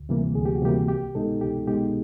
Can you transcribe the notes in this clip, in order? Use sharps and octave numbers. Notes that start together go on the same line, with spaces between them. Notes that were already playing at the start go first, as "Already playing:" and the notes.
Already playing: D2
C3 E3 G3 A#3
D2 G#4
G4
F#4
C3 E3 G3 A#3 G4
C2 G4
B2 G#3 B3 D#4 A4
C2 G4
B2 G#3 B3 D#4 G4